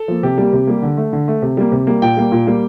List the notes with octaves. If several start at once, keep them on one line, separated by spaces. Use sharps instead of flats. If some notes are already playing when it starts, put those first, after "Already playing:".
Already playing: A4
F3 A#3
C3 G4
G3 A#3
C3
G3 A#3
D3
A3
D3
A3
C3
G3 A#3
C3
G3 A#3
A#2 G5
G3 A#3
A#2
G3 A#3